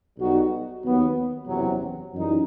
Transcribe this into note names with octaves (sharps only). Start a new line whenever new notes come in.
B1 B2 G3 D#4 F#4
D#2 D#3 F#3 B3
F#1 E2 C3 F#3
F#2 E3 G3 D#4